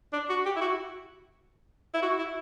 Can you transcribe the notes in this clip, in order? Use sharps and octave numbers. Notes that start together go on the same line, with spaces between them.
D4
F#4
G4
E4
F#4
E4
F#4
E4